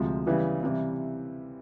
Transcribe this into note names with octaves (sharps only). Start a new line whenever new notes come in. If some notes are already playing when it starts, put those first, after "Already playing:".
Already playing: D2 C3 F3 G#3
C#3 E3 G3 B3 E4
C3 E3 G3